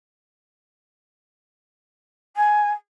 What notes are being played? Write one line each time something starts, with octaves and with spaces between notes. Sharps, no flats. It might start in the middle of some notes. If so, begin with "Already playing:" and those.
G#5